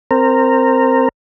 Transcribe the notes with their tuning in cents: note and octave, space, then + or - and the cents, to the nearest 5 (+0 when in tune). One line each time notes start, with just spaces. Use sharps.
C4 +0 A#4 -15